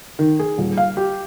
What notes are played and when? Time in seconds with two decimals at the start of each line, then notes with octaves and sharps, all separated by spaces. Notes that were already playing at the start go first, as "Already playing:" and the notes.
0.19 D#3
0.39 G#4
0.58 D#1
0.77 F5
0.97 G4